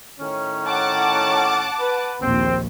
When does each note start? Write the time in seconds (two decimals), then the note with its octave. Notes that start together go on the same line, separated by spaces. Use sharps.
0.20 A2 D#3 C#4
0.66 F#5 A5 D6
1.80 B4
2.22 A#1 D#2 C4